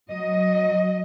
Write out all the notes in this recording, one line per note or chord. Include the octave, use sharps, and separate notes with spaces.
F#3 D#5